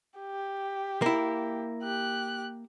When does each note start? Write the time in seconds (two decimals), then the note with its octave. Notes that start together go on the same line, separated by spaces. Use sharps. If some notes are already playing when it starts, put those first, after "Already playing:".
0.19 G4
1.02 A#3 E4
1.83 G4 F#6